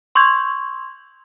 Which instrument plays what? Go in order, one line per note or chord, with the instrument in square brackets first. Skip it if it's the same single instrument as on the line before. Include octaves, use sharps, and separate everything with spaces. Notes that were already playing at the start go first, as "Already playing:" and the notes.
[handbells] C6 C#6 E6 G6 G#6